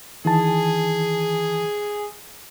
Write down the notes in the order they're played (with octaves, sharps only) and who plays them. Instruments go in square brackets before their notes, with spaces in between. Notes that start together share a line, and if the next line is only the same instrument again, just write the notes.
[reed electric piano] D#3 E3 A5 [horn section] G#4